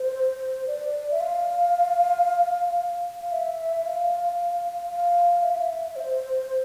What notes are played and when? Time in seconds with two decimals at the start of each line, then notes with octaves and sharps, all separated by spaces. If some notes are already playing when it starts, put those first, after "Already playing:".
Already playing: C5
0.68 D5
1.11 E5
1.20 F5
3.21 F5
3.32 E5
3.85 F5
4.90 F5
5.43 E5
5.51 F5
5.57 E5
5.96 C5